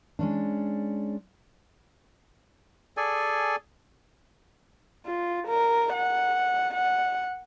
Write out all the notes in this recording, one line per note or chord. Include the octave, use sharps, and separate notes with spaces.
G#3 C#4 D4
G#4 A4 D5 G#5
F4
A#4
F#5
F#5